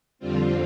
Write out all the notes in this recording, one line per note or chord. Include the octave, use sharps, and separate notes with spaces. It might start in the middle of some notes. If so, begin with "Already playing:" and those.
F2 D3 G3 C4 F4